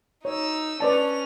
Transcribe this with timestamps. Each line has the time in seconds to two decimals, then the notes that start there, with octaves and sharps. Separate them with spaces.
0.25 D#4 C#5 E6
0.80 C#4 B4 D5 A5 F7